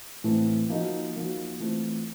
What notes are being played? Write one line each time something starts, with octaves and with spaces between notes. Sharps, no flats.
A2 E3 A3 C4
F3 A#3 D#4 F#4
F3 A#3 D#4 F#4
E3 A3 C4 F4